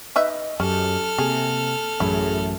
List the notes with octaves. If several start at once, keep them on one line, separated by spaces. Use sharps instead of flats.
D#4 B4 D#5 E5
F#2 C#4 G4 A4 F6
C3 A#3 G#4
A1 F#2 A2 E4 G#4